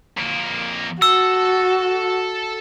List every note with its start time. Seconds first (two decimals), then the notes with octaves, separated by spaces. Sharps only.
0.17 F2 A#3
1.02 F#4 A4 A5 E6